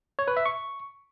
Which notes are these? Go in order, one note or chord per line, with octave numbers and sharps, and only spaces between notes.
C#5
B4
E5
C#6